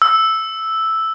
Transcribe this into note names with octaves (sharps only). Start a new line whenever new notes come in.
E6